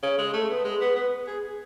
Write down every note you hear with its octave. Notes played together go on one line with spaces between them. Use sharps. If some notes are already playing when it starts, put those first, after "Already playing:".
C#3
G#3
A3
B3
G#3
B3
B3
G#4